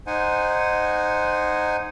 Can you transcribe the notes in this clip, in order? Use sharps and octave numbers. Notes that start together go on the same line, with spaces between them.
D#4 C5 F#5 G#5